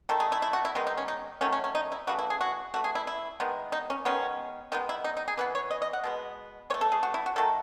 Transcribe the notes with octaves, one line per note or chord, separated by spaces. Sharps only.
D#3 A3 A4
G#4
E4
E4
F#4
E4
D#3 G#3 B3 D#4
D#4
C#4
D#4
D#3 F#3 A3 C#4
C#4
C#4
D#4
E4
C#3 E3 A3 F#4
E4
G#4
F#4
E3 A3 F#4
G#4
E4
E4
D#3 G#3 B3
D#4
C#4
D#3 G#3 B3 C#4
D#3 G#3 B3 D#4
E4
D#4
D#4
G#4
E3 B3 B4
C#5
D#5
D#5
F#5
B2 G#3 B3
E3 A3 C#5
A4
G#4
F#4
E4
F#4
D#3 F#3 A3 A4